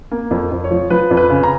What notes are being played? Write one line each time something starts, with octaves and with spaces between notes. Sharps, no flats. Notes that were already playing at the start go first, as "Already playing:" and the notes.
A#3
F2
F2
C#5
F3
F3 B4
F2
B4
C#3
A#5